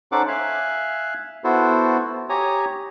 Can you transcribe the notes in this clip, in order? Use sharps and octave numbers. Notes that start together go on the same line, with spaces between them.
C#4 D#4 A4 C5 F#5 D6
E5 F5 G#5 F#6
B3 E4 F#4 A4 C5
G4 C#5 G#5 A#5 D#6